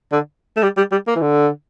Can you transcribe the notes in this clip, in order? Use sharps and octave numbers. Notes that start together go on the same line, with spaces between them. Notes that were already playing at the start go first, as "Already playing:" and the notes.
D3
A3
G3
G3
G3
A#3
E3
D3